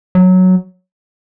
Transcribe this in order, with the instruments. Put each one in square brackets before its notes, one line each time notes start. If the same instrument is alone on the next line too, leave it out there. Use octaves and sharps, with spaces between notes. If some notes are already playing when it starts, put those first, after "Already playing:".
[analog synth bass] F#3